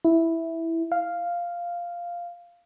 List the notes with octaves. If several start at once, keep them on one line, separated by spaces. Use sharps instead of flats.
E4
F5